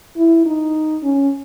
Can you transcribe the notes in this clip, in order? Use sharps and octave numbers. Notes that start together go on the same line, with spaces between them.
E4
D#4
C#4